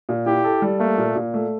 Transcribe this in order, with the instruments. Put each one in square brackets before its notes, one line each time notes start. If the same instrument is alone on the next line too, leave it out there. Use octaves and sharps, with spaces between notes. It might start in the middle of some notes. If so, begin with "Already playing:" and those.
[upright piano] A#2
[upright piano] E4 [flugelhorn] G4
[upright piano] A4
G3
[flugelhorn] A3 [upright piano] A#3
[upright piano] A#2
A#2
A3